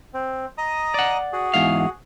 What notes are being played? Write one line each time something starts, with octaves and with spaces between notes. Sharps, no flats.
C4
D#5 A#5 D#6
D5 F#5
F#4 G#4
E2 G#2 F5